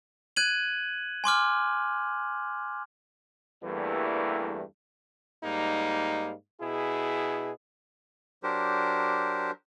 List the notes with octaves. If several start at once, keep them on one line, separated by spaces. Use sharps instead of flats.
F#6 G#6 D#7 F#7
G#5 C6 D6 F6
E2 G2 E3 G3 A3 A#3
G#2 G3 A#3 D#4
B2 E4 G#4
F#3 D4 G4 A#4 C5